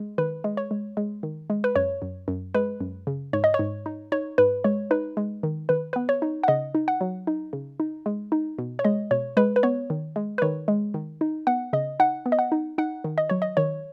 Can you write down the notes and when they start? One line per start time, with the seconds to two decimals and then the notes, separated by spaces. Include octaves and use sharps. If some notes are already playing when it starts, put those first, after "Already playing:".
Already playing: G#3
0.18 D#3 B4
0.44 G#3
0.57 C#5
0.71 G#3
0.97 G#3
1.23 D#3
1.50 G#3
1.64 B4
1.76 F#2 C#5
2.02 F#2
2.28 F#2
2.54 G#3 B4
2.81 F#2
3.07 C#3
3.33 G#2 C#5
3.44 D#5
3.54 C#5
3.59 G#2
3.86 D#4
4.12 D#4 C#5
4.38 G#2 B4
4.64 G#3 C#5
4.91 D#4 B4
5.17 G#3
5.43 D#3
5.69 D#3 B4
5.93 B3 B4
6.09 C#5
6.22 D#4
6.44 F#5
6.48 C#3 D#5
6.75 D#4
6.88 F#5
7.01 F#3
7.27 D#4
7.53 C#3
7.80 D#4
8.06 G#3
8.32 D#4
8.58 B2
8.79 C#5
8.84 G#3 D#5
9.11 B2 C#5
9.37 G#3 B4
9.56 B4
9.63 B3 C#5
9.90 D#3
10.16 G#3
10.38 B4
10.42 D#3 C#5
10.68 G#3
10.94 D#3
11.21 D#4
11.47 B3 F#5
11.73 C#3 D#5
12.00 D#4 F#5
12.26 B3
12.32 D#5
12.39 F#5
12.52 D#4
12.78 D#4 F#5
13.04 D#3
13.18 D#5
13.30 F#3 C#5
13.42 D#5
13.57 D#3 C#5